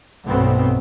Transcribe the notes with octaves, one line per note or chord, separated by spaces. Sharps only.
B1 G2 B2 A3 B3 C4